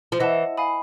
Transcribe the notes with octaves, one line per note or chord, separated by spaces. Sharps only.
F3
E3 D#5 F#5 A5
F5 G#5 B5 D#6